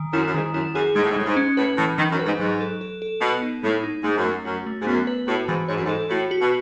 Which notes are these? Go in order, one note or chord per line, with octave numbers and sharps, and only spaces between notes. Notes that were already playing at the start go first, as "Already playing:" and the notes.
Already playing: D#3
F#2 E4
F#2
G#2 D#3
F#2 E4
F#2 G#4
G#2 G#3
A2
G#2
A2 G#3
G#2
C#4
A2 B4
A2 E3
D#3 E3
F#2
B4
G#2
G#2 F#3
A4
A4
A4
B2 B3
D#4
A2 G#3
D#4
G#2 A3
F#2
A3
F#2 F#4
A3
G#2
F#2 B3
B4
A2 F#4
G#2 E3
G#2 C#5
F#2
G#2
A4
A2 F#4
F#4
B2